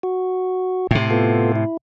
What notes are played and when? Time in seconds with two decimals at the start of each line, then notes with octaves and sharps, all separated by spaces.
0.03 F#4
0.91 A2 C3
1.11 B3 F4 A4
1.56 E4